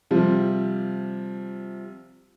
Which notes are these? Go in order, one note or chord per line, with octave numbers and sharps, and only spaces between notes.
C3 F3 G3